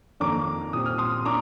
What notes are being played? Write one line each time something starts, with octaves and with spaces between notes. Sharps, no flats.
F2 D#3 A#3 D4 A#5 D6
A#2 G3 C4 D#6
F6
C6 D#6
A#3 D4 A#5 D6